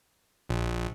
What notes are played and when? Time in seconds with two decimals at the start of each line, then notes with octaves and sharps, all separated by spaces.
0.49 A#1